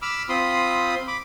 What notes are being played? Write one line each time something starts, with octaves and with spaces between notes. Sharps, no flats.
B5 D6 E6 F6
C4 F4 B5 C6 D#6
B5 D6